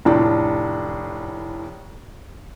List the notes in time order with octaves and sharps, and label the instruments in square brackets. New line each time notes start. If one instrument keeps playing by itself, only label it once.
[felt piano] F1 A2 D4